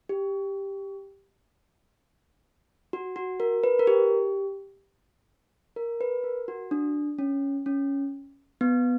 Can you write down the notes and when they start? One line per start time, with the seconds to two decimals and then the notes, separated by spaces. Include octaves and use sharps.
0.09 G4
2.93 F#4
3.16 F#4
3.40 A#4
3.64 B4
3.79 A#4
3.87 G4
5.76 A#4
6.01 B4
6.24 A#4
6.48 F#4
6.71 D4
7.19 C#4
7.66 C#4
8.61 B3